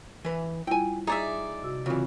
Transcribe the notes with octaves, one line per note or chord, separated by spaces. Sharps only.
E3 B4
G3 E4 F4 G5 G#5
D#4 G#4 D5 E5 A#5 G#6
C3 F#4 E6
C#3 E3 C4 F4 F#4